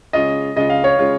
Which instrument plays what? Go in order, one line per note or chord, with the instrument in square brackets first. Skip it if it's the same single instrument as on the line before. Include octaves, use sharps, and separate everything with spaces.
[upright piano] C#3 G#3 C#4 F4 [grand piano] D#5
[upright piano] C#3 G#3 C#4 F4 [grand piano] D#5
[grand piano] F5
C#5
[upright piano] C#3 G#3 C#4 F4